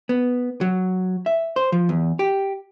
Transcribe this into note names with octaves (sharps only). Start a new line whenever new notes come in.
B3
F#3
E5
C5
F3
E2
G4